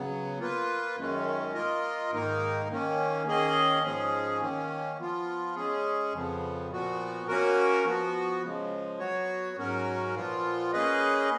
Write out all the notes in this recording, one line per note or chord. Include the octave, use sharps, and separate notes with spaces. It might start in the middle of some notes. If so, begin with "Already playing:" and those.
Already playing: C#3 F#3 B3
A#3 F4 B4
F#2 D#3 G#3 C#4
A#3 F4 A#4 D#5
G#2 D#3 A#3 D#4 A#4
D#3 A#3 C#4
D#3 A#3 C#4 G#4 D#5
G#2 F3 G#3 C#4 G#4
D#3 A#3 C#4
F3 B3 F4
G#3 C#4 G#4
F2 C#3 F3 B3
A#2 F3 B3 F#4
A#3 C#4 F#4 A#4
F3 B3 F#4
C#3 F3 G#3
F#3 B3 F#4 C#5
G#2 F#3 C#4 F#4 A#4
A#2 F3 B3 F4
A#3 C#4 G#4 B4 D#5